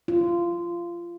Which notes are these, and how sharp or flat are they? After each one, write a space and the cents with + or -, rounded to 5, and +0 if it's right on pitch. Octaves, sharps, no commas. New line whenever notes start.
F4 -20